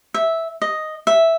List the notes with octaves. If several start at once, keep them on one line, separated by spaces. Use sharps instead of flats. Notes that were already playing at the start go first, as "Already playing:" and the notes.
E5
D#5
E5